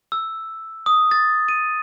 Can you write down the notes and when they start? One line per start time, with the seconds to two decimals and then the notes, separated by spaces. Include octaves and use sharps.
0.12 E6
0.86 D#6
1.11 A6
1.48 D#7